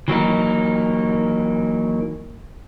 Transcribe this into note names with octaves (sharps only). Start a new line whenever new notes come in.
E3 F#3 A#3 D#4